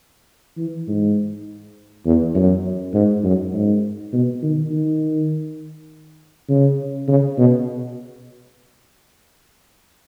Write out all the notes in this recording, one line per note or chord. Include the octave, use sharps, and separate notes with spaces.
E3
G#2
E2
F#2
G#2
F#2
G#2
B2
D#3
D#3
C#3
C#3
B2